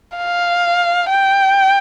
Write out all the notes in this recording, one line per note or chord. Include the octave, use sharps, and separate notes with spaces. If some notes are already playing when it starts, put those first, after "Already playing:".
F5
G5